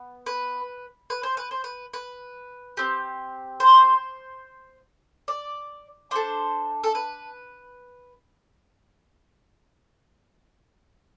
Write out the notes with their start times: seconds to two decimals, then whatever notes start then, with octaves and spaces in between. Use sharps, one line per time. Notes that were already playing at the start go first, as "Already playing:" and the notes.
Already playing: B3
0.26 B4
1.10 B4
1.23 C5
1.37 B4
1.51 C5
1.64 B4
1.94 B4
2.77 C4 G4
3.60 C5
5.28 D5
6.11 D4 A4 C5
6.84 A4
6.95 B4